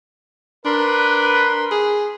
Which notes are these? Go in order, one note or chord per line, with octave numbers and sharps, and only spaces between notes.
D4 A#4 B4 B5 C6
G#4